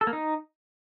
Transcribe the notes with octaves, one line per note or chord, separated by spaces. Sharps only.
A4
A#3
D#4